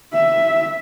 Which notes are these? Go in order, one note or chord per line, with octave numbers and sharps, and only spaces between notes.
E5